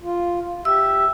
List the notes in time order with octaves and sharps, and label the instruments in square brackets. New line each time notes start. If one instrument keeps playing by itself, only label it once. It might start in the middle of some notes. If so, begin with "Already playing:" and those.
[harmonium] F4
[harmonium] G4 E5 [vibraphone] E6